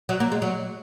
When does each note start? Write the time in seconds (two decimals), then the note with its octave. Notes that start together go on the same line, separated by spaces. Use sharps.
0.09 F#3
0.20 A#3
0.32 G#3
0.42 F#3